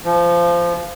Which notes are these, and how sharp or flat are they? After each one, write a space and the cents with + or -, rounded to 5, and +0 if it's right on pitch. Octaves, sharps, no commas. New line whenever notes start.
F3 -20